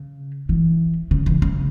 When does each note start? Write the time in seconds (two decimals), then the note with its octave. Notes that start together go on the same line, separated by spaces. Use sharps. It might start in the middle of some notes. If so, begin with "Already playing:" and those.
Already playing: C#3
0.49 E3
1.11 C#3
1.26 E3
1.42 C#3